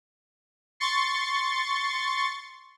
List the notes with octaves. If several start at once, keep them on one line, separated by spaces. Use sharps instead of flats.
C6 C#6 A6